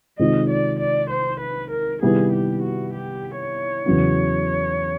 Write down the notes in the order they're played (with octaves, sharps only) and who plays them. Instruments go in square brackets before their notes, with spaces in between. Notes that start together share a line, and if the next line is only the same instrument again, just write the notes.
[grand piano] C3 D#3 G#3 C4 F4 [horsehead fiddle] D#5
[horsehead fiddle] D5
D5
C5
B4
A#4
[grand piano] C3 D#3 G3 B3 E4 [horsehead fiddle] G#4
[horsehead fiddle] G4
F#4
G4
C#5
[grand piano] E2 C#3 F#3 B3 E4